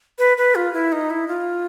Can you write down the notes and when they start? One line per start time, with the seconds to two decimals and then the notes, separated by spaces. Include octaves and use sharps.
0.18 B4
0.37 B4
0.55 F4
0.73 E4
0.92 D#4
1.10 E4
1.28 F4